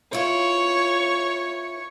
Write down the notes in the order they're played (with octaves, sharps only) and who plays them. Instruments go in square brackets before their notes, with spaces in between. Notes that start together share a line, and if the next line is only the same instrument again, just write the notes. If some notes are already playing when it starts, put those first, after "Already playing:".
[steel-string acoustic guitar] E4 F4 [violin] C#5